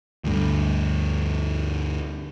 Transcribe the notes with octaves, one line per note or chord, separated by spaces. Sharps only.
D2 G2